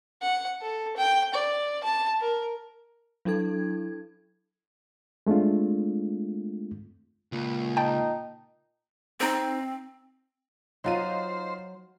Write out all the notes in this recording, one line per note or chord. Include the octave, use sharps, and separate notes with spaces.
F#5
A4
G5
D5
A5
A#4
F#3 D4 E4 A4 G#6
G#3 A3 C4 D4 F4
C#2 A#2
D#4 G5 A5
C4 D#4 C5
F#3 D#4 F4 C5 A#5 D#7